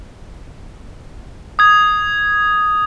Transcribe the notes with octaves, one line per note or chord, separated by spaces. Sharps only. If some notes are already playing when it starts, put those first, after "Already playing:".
D#6 G#6